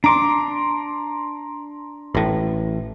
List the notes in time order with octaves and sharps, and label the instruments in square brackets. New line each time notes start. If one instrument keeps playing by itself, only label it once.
[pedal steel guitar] D4 D6 [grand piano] A#5 C6
[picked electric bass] A1 A2